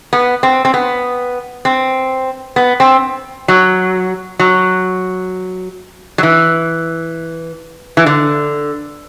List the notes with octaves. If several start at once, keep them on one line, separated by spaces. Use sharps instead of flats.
B3
C4
C4
B3
C4
B3
C4
F#3
F#3
F#3
E3
E3
D3